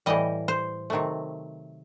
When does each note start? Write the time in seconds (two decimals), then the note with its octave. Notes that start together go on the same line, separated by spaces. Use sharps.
0.06 A2 E3 G3 D#5
0.48 C5
0.90 C3 D#3 F#3 A3